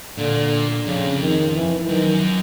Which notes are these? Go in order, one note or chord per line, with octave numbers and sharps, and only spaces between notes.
A#2 D3
F2 C#3
D#3
E3
F#2 D#3